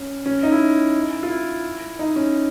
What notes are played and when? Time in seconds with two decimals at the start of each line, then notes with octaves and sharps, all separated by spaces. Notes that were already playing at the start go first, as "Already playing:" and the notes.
Already playing: C#4
0.26 C#4
0.43 D#4
0.52 E4
1.23 F4
1.30 E4
1.99 D#4
2.16 C#4